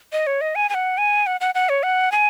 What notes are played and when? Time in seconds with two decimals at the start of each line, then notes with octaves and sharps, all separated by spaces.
0.13 D#5
0.27 C#5
0.41 D#5
0.55 G#5
0.69 G#5
0.74 F#5
0.98 G#5
1.27 F#5
1.41 F#5
1.55 F#5
1.69 C#5
1.83 F#5
2.12 G#5